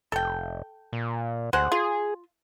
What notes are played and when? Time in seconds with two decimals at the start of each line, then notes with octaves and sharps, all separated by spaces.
0.12 F1 A4 G5
0.93 A#2
1.53 D2 G#3 C5 F#5
1.72 F4 G#4